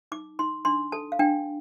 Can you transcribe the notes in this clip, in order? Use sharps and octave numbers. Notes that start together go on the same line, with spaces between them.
D#4 D6
D#4 C6
D4 C6
A4 A5
F5
D4 G5